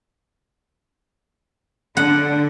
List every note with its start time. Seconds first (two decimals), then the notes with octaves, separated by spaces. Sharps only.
1.97 D3 F#5